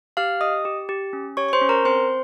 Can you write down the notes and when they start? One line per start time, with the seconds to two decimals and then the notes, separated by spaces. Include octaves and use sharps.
0.17 G4 F5 F6
0.41 G4 D#5 D#6
0.65 G4
0.89 G4
1.13 C#4
1.37 G4 C#5 C#6
1.49 C#6
1.53 C5 C6
1.61 C#4
1.69 A#4 A#5
1.85 C4 C5 C6